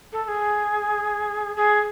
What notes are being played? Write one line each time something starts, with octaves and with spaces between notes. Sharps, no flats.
A4
A4
G#4
G#4